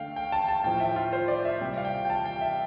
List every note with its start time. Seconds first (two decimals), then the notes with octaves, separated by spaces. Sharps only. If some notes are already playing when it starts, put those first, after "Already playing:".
Already playing: D3 A3 F5 G5
0.16 G5
0.32 A5
0.48 A5
0.64 A2 F3 A3 G5
0.80 E5
0.96 F4
1.13 C5
1.28 D5
1.45 E5
1.61 C3 G3 G5
1.78 F5
1.85 G5
2.05 G5
2.10 A5
2.26 G5
2.41 E5